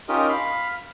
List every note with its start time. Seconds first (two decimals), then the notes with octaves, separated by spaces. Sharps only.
0.09 C#4 D#4 F4 G4 A#4 D#5
0.29 F5 B5